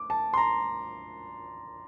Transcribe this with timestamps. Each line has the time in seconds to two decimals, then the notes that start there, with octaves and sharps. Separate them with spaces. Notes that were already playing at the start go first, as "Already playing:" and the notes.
Already playing: D6
0.10 A5
0.34 C6
0.38 A#5